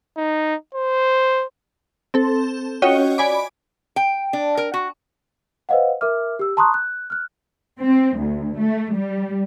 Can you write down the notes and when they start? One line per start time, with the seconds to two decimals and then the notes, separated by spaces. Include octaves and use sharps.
0.17 D#4
0.75 C5
2.14 C4 A4
2.82 C#4 F4 F#4 C#5 D#5 G5
3.18 D5 G#5 B5 D6
3.96 G5
4.33 D4
4.57 A#4
4.74 F#4
5.69 B4 C5 D#5 F5 F#5
6.01 A#4 E5 D6 F6
6.39 G4 E6
6.57 A5 A#5 C6 C#6 D#6 F#6
6.74 F#6
7.10 F6 F#6
7.81 C4
8.18 D2
8.59 A3
8.93 G3